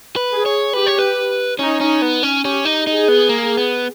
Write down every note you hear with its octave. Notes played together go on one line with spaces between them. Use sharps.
B4
G#4
C#5
G4 B4
C#5
B4
C#4 D#4
C#4
B3
C#4
C#4 G4
D#4
D#4 G#4
B3
A#3
B3